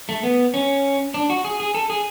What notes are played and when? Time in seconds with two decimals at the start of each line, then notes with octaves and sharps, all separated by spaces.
0.09 A3
0.23 B3
0.54 C#4
1.14 D4
1.30 F#4
1.45 G#4
1.60 G#4
1.74 A4
1.90 G#4